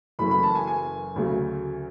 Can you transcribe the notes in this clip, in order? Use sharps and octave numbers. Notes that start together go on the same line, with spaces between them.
F#1 F#2 E3 A3 B5
B5
A5
G#5
G#5
D2 C#3 F#3 A3